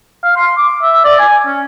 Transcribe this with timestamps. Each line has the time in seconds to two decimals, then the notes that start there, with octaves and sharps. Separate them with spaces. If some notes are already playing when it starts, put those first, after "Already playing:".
0.23 F5
0.36 C6
0.57 D6
0.82 E5
1.04 D5
1.19 G#5
1.46 C#4